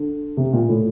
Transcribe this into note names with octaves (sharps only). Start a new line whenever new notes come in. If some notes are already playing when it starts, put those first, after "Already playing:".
Already playing: D3
C3
A#2
A2